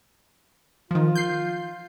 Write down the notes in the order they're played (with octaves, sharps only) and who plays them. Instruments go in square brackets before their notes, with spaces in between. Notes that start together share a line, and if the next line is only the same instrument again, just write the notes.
[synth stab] D#3 F3 [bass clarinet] F4
[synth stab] G6 C7